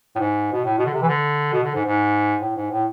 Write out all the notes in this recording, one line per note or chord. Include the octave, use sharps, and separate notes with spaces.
A2
G#2
B2
A2
B2
D3
C3
E3
D3
B2
D3
G#2
G#2
A2
G#2
A2